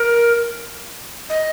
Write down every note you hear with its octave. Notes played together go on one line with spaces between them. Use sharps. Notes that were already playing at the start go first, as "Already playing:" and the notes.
Already playing: A#4
D#5